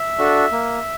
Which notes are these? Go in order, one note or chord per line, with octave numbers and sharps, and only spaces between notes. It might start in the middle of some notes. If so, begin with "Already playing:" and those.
Already playing: E5
D4 F#4 A4
A#3